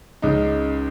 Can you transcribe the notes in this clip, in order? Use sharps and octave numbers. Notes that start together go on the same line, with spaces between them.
C#2 C#3 D#4